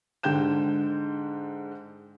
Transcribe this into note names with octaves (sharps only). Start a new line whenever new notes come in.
G#2 D3 G5 G6 E7